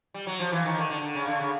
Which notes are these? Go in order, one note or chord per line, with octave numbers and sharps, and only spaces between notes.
G3
F#3
F3
E3
D#3
D3
D3
D3
C#3
D3
C#3